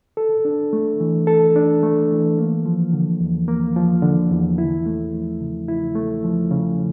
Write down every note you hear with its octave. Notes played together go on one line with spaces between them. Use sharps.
A4
D4
A3
E3
A4
D4
A3
E3
A#3
F3
D3
E2
A#3
F3
D3
E2
E4
A3
F3
C#3
E4
A3
F3
C#3